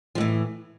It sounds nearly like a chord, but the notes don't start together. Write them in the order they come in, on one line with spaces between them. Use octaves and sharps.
F3 A2 E3